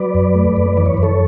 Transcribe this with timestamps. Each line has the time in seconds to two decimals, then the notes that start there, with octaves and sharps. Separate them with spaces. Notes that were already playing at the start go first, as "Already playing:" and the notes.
Already playing: F#3 B4 D5
0.14 F#2
0.35 A3
0.56 F#2
0.77 E3 D5
0.86 C#5
0.94 F#2 B4
1.03 A4 C#5